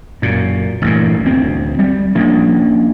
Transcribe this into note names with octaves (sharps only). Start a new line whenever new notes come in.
F#2 A#2
A1 G2 A#2
D2 C4
G3
F3 A#3 C#4 D4